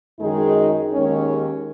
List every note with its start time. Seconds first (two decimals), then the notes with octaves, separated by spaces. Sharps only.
0.20 F#2 D#3 G#3 D#4 G#4
0.93 D#2 D#3 G#3 C#4